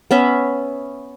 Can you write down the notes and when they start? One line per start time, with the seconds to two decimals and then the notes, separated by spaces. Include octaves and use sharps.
0.11 B3 C#4 E5 B5